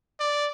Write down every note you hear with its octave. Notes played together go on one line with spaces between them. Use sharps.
D5